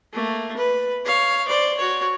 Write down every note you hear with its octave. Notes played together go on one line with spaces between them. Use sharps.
A3 A#3
B4
C#5 F5
C5 D5
F#4 C#5